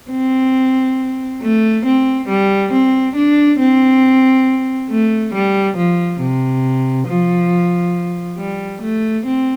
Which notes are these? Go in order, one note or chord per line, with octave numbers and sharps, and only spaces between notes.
C4
A3
C4
G3
C4
D4
C4
A3
G3
F3
C3
F3
G3
A3
C4